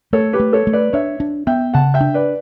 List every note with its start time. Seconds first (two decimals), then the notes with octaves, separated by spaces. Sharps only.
0.13 A3 A4 C#5
0.33 G4 B4
0.40 A3
0.53 A4 C#5
0.67 A3
0.73 B4 D5
0.93 D4 C#5 E5
1.20 D4
1.47 B3 E5 G5
1.74 C#3 F#5 A5
1.94 E5 G5
2.01 D4
2.14 B4 D5